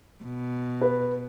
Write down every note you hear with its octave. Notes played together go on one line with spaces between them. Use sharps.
B2
B4